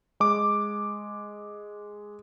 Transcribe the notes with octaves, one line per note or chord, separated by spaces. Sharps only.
G#3 D6